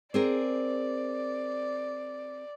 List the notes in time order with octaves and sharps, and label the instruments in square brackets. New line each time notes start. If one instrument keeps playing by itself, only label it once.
[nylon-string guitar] C4 G#4 A#4 [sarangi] D5